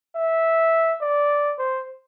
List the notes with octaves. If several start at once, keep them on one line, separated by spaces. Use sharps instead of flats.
E5
D5
C5